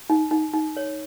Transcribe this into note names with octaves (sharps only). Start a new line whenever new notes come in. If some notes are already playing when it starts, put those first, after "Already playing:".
D#4
D#4
D#4
C#5